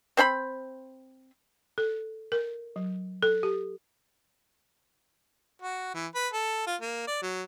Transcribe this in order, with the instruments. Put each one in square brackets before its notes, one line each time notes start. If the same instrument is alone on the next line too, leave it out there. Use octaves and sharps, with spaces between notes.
[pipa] C4 C5 G5 B5
[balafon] A4
A#4
F#3
A4
G4
[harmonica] F#4
E3
B4
A4
F4
A#3
D5
F#3